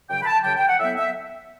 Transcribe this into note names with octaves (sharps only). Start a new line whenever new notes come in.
F#2 C#3 F#3 G5
B5
A5
F#2 C#3 F#3 G5
G5
F#5
A2 F#3 B3 E5
E5